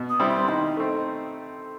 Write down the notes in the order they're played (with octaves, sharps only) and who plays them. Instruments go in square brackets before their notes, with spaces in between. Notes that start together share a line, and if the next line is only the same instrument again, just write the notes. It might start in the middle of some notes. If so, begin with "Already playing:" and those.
Already playing: [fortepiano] B2
[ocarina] D#6
[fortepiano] G3 C4 E4
[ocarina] C6
[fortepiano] D#3 [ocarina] D#5
[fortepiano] A3 C4